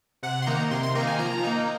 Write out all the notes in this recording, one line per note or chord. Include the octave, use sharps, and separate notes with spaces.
C3 F#5
C6
D#3 A#3 D#4 A#5
C3 C6
C6
D#3 A#3 D#4 A#5
G#5
F3 A#5
A#3 D#4